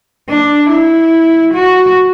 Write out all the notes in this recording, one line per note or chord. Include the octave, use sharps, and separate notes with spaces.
D4
E4
F#4